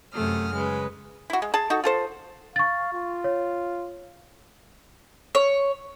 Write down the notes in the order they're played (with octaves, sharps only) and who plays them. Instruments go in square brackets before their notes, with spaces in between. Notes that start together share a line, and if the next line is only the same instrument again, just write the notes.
[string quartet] F#2 C3 A3 D#6 F6
C#3 G#3 B4
[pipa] E4 F#4
G#3
G#4 A5
D#4 F#4 A4
F4 A4 C5
[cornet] F5 [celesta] C#6 A6
[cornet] F4
[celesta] C#5
[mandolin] C#5